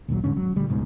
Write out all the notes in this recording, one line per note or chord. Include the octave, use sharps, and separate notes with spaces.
A#1 D#2 E3 F#3
E2 G#2 D3 C#4
F#3
D#1 D2 G3
D#1 C#2 G#2 B2